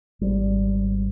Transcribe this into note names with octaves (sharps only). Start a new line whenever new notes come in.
G#1 G3